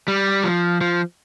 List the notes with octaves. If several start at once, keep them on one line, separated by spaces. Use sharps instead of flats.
G3
F3
F3